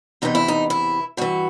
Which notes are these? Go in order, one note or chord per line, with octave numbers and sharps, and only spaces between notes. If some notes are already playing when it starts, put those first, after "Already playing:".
E2 C3 E3 D#4
E4
D#4
E4
G2 E3 F#4